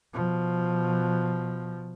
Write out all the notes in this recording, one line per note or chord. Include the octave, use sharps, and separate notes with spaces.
B2 F3